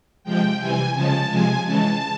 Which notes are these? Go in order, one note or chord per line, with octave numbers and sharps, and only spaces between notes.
C3 F3 G#3 G5
C3 E3 G3 G#5
C#3 F3 G#3 A5
C3 F3 G#3 G#5
C#3 E3 G#3 A5